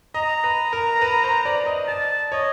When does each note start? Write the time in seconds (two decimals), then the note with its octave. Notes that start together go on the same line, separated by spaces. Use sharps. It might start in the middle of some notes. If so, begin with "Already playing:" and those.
0.14 D#5 A#5
0.44 B4
0.73 A#4
1.02 B4
1.24 C5
1.45 D5
1.66 D#5
1.88 D5 A5
2.32 C#5 D#5